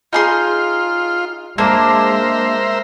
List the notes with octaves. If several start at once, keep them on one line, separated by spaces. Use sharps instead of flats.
D#4 F4 G#4 C6
G#3 A#3 D4 A#4 C5 E5